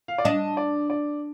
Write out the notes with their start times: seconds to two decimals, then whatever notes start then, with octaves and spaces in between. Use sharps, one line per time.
0.08 F5
0.18 D5
0.25 D4 D#5
0.57 D5
0.90 D5